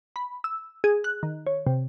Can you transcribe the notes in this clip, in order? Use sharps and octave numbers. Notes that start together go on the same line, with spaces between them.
B5
E6
G#4
F#6
D#3
C#5
C3